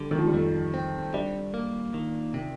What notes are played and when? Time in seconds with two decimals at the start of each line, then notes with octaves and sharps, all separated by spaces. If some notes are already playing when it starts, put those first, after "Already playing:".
Already playing: D3 G3
0.11 D#3
0.18 F3
0.27 G3
0.34 F2 A3
0.74 C4
1.14 G3 D4
1.54 A#3
1.94 D#3
2.34 C3